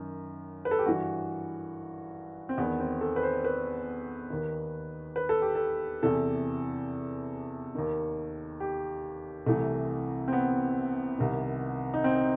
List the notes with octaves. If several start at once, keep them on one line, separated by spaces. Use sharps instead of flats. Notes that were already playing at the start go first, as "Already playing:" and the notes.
Already playing: F#2 D#3
B4
A4
G4
G2 E3 F#4
C4
E2 D#3 B3
C4
A4
B4
C5
B4
D#2 D#3
B4
A4
G4
A4
E2 C3 E3 A4
D#2 D#3
G4
C2 C3 E3 A3
C4
B3
C2 C3 D#3
D#4
C4